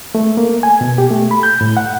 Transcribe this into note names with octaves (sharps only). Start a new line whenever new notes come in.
A3
A#3
G#5
B2
G4
A3
B5
G6
A2
F#5